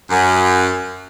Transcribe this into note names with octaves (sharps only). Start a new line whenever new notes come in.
F#2